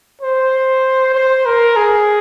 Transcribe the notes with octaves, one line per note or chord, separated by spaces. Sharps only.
C5
C5
A#4
G#4